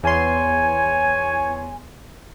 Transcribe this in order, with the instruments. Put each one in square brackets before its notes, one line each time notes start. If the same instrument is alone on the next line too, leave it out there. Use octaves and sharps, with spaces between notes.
[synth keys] E2 C6 [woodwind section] C#5 G#5